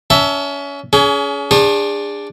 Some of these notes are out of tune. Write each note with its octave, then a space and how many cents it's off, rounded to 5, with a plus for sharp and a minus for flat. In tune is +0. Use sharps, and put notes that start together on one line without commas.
C#4 +30 E5 +0 A5 +20
C#4 +35 G#4 +15
D4 +0 G#4 -30 C#5 -45